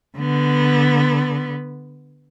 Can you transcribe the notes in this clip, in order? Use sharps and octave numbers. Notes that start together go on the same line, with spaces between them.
D3 B3